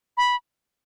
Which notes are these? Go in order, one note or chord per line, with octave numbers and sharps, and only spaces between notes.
B5